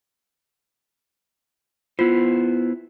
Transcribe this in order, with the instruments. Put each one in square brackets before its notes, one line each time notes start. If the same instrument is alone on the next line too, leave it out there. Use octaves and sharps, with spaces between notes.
[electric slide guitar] B3 E4 C5 [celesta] F4